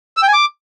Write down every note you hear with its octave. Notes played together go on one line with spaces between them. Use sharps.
E6
G5
G#5
D6